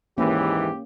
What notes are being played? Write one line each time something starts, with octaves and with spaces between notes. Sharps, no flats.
D#2 G#2 E3 A#3 C#4 G4